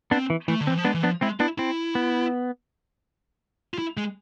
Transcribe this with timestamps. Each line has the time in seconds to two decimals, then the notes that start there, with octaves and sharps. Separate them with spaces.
0.11 B3 C4 D4
0.30 E3
0.48 E3 A3
0.60 D3
0.67 E3 C4
0.77 F3
0.85 G#3 B3 D4
0.94 E3
1.03 F3 B3 D4
1.21 G#3 C4 E4
1.40 B3 D4 E4
1.58 C4 E4
1.95 B3
3.74 F4
3.78 E4
3.97 G#3